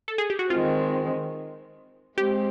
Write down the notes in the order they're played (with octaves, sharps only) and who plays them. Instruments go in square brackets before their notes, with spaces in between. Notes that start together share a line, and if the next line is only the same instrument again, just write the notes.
[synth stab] A4
G#4
G4
F#4
[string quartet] D#3 G#3 C4 [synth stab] F4
[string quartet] G#3 C4 [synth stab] G4